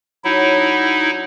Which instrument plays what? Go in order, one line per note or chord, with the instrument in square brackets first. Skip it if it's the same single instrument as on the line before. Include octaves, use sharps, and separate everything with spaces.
[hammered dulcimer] F#3 [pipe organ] D#4 E4
[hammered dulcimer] D4